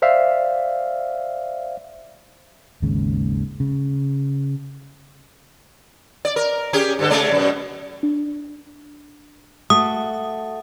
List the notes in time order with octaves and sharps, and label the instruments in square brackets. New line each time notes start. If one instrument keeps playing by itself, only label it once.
[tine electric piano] C5 D5 E5 F5
[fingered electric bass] G#1 D#2 G#2 C#3
C#3
[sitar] D5
A#4
C#4 G4 G#4
G2 D3 A4
C#3 G#3 D5
F#2 B2
[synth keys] D4
[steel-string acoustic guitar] A3 F#4 [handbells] D#6